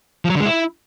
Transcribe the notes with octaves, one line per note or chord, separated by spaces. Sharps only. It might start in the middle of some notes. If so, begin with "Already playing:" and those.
F3
F#3
D3
G#3
E4